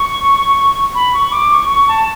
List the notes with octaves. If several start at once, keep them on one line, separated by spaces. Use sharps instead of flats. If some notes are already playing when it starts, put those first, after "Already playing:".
Already playing: C#6
B5
C#6
D6
C#6
C#6
A5